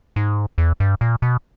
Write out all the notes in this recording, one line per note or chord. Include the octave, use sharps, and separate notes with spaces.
G#2
E2
G2
A#2
B2